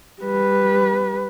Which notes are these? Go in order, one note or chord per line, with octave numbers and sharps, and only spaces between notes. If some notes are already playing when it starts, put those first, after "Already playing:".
G3 B4